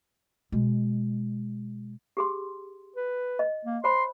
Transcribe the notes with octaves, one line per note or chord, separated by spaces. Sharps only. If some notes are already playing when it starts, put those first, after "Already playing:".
B2 G#3
G4 G#4 C6
B4
D#5
A#3
C5 C#5 B5 C6